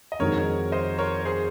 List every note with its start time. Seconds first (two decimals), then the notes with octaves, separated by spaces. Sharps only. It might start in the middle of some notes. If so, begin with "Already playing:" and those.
0.12 D#5
0.19 F2 D#3 G#3 D#4 F#4 A#4 C#5
0.72 C5 D#5
0.99 A#4 C#5
1.25 G#4 C5